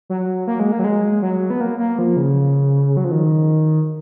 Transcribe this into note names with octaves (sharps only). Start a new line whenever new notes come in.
F#3
A#3
G#3
A#3
F#3
G#3
F#3
B3
A#3
A#3
F3
C#3
F#3
F3
D#3